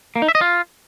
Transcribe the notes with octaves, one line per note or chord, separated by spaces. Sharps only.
A#3
D#4
E5
D#5
F4